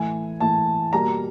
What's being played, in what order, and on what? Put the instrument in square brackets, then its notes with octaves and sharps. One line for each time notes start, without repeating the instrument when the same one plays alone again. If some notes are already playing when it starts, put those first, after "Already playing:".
Already playing: [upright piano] A2 E3 A3 G#5
A2 E3 A3 A5
B2 G3 A#3 A#5